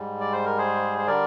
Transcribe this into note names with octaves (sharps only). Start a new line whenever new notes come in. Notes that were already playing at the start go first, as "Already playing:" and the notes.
Already playing: G#2 G3
D5
C5
A#4
G#4 C5
C5
D3 G3 A#4 D5